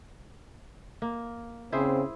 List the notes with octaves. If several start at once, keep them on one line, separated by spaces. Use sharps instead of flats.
A#3
C#3 C4 E4 G#4 C5